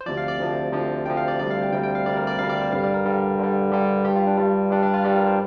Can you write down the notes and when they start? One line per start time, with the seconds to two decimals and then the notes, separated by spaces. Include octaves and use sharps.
0.01 C5
0.06 D2 C3 F3 D5
0.17 F5
0.28 D5
0.40 D2 C3 F3
0.72 D2 C3 F3
1.06 D2 C3 F3 G5
1.17 F5
1.28 D5
1.39 D2 C3 G3 D5
1.51 F5
1.61 G5
1.72 D2 C3 G3 G5
1.83 G5
1.95 F5
2.06 D2 C3 G3 D5
2.17 A#4
2.27 D5
2.39 D2 C3 G3 F5
2.50 D5
2.61 C5
2.72 G2 D3 G3 F5
2.84 D5
2.94 A#4
3.05 G2 D3 G3
3.39 G2 D3 G3
3.72 G2 D3 G3 G4
4.05 G2 G3 G4
4.16 F4
4.27 D4
4.38 G2 G3
4.71 G2 G3 D4
4.83 D4
4.94 F4
5.04 G2 G3 G4
5.16 A#4
5.27 C5